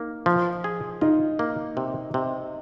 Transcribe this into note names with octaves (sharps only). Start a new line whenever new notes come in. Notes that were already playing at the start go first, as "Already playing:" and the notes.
Already playing: A#3 D#4
F3
G#4
D#4 F4
A#3
C3
C3